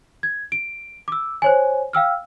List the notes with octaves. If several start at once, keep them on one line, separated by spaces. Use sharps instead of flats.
G#6
D7
D6 E6
C5 C#5 G#5
F5 G5 E6 F6